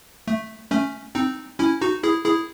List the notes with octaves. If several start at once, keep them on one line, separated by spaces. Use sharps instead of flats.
A3
A3 C#4
C4 D#4
C#4 E4
D#4 F#4
E4 G#4
E4 G#4